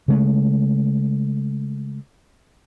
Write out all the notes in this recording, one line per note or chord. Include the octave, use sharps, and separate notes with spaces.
C#3 G#3 A3